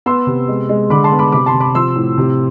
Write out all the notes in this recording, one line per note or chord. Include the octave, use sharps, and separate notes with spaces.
B3 C6 E6
C3
G#3
G#3
D3 B5 D6
A5 C6
B3
B5 D6
C3 B5 D6
A5 C6
C3
B5 D6
F3 C6 E6
A2
C3